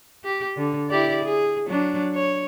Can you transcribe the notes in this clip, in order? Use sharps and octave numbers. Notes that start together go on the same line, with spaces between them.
G4
D3
E4 G4 D5
G#4
F#3 D4
C#5